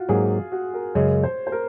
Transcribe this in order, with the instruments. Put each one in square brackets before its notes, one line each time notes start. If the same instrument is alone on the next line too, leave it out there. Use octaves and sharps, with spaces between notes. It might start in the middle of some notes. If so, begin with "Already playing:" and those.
Already playing: [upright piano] F4 F#4
[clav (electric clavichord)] G#2 F#3 A#3 [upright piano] G#4
[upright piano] F#4
A#4
[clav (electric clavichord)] F#2 C#3 G#3 [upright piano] C#5
[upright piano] C5
C5
A#4